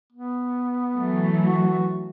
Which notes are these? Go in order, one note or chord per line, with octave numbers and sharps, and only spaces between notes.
B3
E3 F#3 A3
F#4